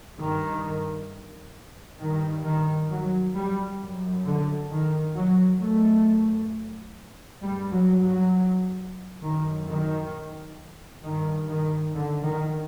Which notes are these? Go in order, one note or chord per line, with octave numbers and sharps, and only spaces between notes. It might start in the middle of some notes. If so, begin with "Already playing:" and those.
G2 D#3
G2 D#3
D#3
F#3
G3
F#2
D3
D#3
F#3
F#2 A3
G2 G3
F#3
F#3
F#2 D#3
D#3
G2 D#3
D#3
D3
D#3